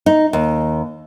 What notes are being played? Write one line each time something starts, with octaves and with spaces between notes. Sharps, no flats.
D#4
D#2